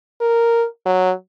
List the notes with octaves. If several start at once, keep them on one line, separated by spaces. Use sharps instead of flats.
A#4
F#3